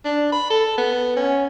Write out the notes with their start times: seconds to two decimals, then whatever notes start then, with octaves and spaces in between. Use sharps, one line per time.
0.05 D4
0.32 B5
0.50 A4
0.78 B3
1.17 C#4